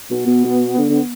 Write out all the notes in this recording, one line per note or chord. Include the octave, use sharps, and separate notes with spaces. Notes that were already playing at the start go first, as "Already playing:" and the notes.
B2 B3
B2
B2
D3
D3